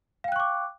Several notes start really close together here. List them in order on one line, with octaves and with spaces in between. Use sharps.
F5 G5 F#6 C#6 D6